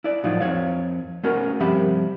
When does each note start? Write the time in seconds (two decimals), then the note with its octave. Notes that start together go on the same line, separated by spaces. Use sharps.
0.04 E4 D5
0.24 A2 F3 F#3 D#4 F4
0.40 F2 G#2 C#5 F5
1.24 A3 B3 C#4 F#4 A#4
1.60 G2 C3 F3 G4 E5 B5